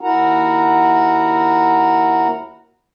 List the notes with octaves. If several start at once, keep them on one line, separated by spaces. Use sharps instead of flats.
D#2 E4 F#4 A#4 F#5 A#5